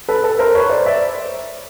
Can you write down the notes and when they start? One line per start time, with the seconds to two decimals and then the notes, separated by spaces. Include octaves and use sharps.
0.08 A4 B4
0.24 A4 B4
0.39 A#4 C5
0.55 B4 C#5
0.70 C5 D5
0.85 D5 E5